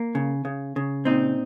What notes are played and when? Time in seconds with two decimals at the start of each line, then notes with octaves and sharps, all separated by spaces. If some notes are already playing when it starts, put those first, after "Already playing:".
Already playing: A#3
0.15 C#3
0.45 C#3
0.76 C#3
1.05 A#2 C4 D#4